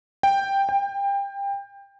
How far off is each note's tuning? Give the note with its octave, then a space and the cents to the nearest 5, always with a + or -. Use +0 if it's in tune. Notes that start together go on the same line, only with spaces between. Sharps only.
G5 +5
G5 +25